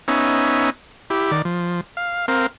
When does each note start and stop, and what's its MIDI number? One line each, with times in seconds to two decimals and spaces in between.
0.08 0.70 59
0.08 0.70 61
0.08 0.70 63
0.08 0.70 76
0.08 0.70 80
1.10 1.31 64
1.10 1.31 67
1.31 1.42 51
1.31 1.42 74
1.45 1.81 53
1.97 2.26 77
2.28 2.47 60
2.28 2.47 70
2.28 2.47 77